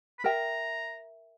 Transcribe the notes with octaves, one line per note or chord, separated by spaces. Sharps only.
B5
A#4 E5 G5 A#5